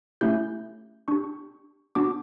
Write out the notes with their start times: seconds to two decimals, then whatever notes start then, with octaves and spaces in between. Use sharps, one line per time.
0.21 A3 C#4 E4 G4 G6
1.08 D4 G4 C#6
1.95 B3 D4 F#4 D6